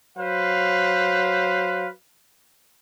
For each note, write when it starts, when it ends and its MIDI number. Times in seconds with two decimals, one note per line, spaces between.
0.17 1.87 54
0.17 1.87 71
0.17 1.87 72
0.17 1.87 77